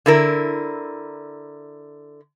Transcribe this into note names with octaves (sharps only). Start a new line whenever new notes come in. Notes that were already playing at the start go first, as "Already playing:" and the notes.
D3 E4 A#4